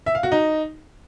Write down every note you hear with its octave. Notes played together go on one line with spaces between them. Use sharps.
E5
F5
F#4
D#4